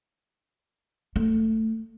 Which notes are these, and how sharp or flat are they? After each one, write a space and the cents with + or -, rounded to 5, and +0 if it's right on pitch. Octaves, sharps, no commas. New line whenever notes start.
A3 +10